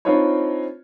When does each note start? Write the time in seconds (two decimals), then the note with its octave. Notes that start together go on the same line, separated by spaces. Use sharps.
0.05 C4 D4 D#4 F4 B4 C#5